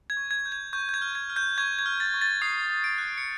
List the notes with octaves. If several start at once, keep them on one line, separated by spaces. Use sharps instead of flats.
G#6
C#6
G#6
G6
G#6
C#6 G6
G6
G#6
F6
G#6
F6
G6
C#6 G#6
G#6
F6
A6
C#6
A6
D#6 C7
D#6
D7
F#6
C#7